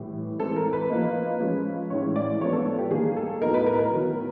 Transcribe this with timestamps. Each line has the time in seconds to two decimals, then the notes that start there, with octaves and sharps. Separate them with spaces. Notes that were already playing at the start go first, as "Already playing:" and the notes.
Already playing: A2 E3 G3
0.39 E3 G#3 C4 A4
0.56 A#4
0.73 B4
0.90 F3 A#3 D#4
1.40 F3 G#3 C#4
1.90 A2 E3 G#3 C#4 C#5
2.16 D5
2.41 F3 G#3 B3 D4 C#5
2.53 A4
2.78 G4
2.91 D#3 G3 A#3 G#4
3.16 A4
3.41 A2 F#3 B3 D#4 A#4
3.54 B4
3.66 A#4
3.79 A#4
3.92 D#3 F#3 B3